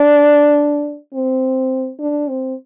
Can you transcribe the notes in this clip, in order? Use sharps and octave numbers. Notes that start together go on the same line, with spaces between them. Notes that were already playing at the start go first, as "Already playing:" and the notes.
Already playing: D4
C4
D4
C4